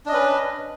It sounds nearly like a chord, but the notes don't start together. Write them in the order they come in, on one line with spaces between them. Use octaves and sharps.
D4 D#5 C#4 B4